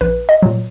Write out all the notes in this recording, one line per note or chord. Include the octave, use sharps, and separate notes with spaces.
A#1 B4
D#5
A#2 F#3